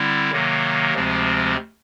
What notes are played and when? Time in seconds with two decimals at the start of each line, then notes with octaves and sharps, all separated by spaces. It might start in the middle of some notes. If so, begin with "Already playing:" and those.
Already playing: D3 G3 C4 E4
0.31 C3 D#3 F#3 A#3
0.94 D2 C3 F3 G#3 C4